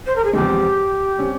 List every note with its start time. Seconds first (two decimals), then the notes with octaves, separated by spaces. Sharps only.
0.06 C5
0.15 A#4
0.24 G#4
0.33 E2 C3 F3 G#3 G4
1.18 C3 G3 C#4